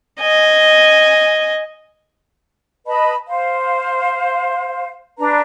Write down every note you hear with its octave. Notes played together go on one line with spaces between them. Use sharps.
D#5 G#5
B4 D#5 A5 B5
C5 F5
D4 B4 A#5